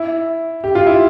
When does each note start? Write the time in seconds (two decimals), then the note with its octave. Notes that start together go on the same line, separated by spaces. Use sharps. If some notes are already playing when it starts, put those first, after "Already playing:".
Already playing: E4
0.64 G4
0.75 F4
0.86 E4